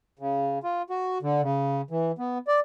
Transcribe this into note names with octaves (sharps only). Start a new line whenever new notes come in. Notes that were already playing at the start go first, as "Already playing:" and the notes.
C#3
F4
F#4
D3
C#3
E3
B3
D5